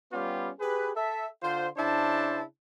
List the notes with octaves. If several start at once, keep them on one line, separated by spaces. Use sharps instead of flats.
G3 B3 C#4 F4 G4
G4 G#4 B4
A4 E5
D3 F4 C5
C#3 D4 E4 C5 A5